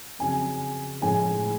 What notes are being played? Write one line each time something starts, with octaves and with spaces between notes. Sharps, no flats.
F2 C#3 F#3 G#5
A2 F3 G#3 G#5